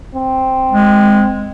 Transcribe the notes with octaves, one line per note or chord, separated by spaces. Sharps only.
C4
G#3